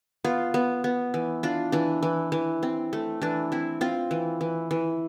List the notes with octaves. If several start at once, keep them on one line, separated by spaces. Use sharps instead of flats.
B3 F4
B3
B3
E3
D4 F4
E3 D4
E3
E3
C4
A3
E3 D4
C4 E4
C4 F4
E3
E3
E3